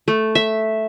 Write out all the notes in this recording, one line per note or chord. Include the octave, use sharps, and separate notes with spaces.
A3
E5